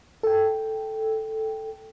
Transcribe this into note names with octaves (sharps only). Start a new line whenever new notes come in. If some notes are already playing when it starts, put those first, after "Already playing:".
A4 G5